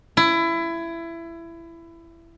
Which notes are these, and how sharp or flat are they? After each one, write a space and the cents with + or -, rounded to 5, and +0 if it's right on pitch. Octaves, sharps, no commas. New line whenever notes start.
E4 +20